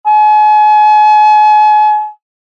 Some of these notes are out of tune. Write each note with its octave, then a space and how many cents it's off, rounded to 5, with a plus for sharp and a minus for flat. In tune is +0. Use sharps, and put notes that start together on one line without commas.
G#5 +40